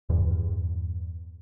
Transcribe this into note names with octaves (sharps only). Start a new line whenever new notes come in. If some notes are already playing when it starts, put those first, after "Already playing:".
E2 G2